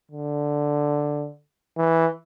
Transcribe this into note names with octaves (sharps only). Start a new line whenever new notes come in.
D3
E3